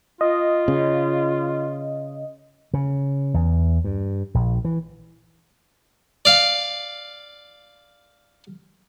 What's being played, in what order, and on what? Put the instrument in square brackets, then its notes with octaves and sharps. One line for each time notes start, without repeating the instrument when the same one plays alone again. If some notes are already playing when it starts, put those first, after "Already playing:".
[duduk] F4 [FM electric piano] D#5
[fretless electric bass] C#3
[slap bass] C#3
E2
G2
A#1
E3
[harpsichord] D5 F5